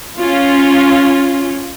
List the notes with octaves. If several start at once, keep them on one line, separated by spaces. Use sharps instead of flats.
C#4 F4